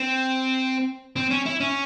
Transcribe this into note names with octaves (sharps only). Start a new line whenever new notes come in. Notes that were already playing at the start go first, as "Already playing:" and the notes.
Already playing: C4
C4
C#4
E4
C#4